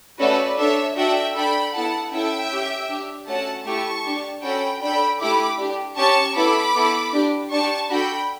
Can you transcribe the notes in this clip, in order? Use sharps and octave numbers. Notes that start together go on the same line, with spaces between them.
A3 C#4 F#4 A4 B4 D5
D4 A4 C#5 E5
D4 F#4 A4 E5 G5
D4 A4 G5 B5
B3 E4 A4 F#5 A5
C#4 E4 A4 E5 G5
C#4 G4
D4 G4
A3 C#4 F#4 F#5 A5
A3 E4 G4 A5 C#6
D4 G4
C#4 F#4 A4 G5 B5
D4 A4 G5 B5
A3 E4 G4 B5 D6
D4 G4
C#4 G4 A5 C#6
B3 E4 A4 B5 D6
B3 E4 A4
D4 G4
D4 G4 A5 C#6
D4 F#4 A4 G5 B5